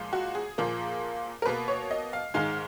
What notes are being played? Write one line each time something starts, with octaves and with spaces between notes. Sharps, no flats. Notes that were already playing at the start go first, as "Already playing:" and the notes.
Already playing: A#2 F3 G#3
F#4
G#4
A#2 F3 A#3
A#4
B2 A#3 B4
C#5
D#5
F5
G#2 D#3 G#3 F5